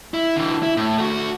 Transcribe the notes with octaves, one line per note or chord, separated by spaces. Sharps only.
E4
D3 E3
E4
A2
A3 F#4